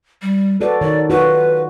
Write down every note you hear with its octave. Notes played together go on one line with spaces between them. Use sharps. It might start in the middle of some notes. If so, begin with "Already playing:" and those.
G3
F#4 A4 B4 D5
D#3 A#4 C#5 D5
F4 F#4 B4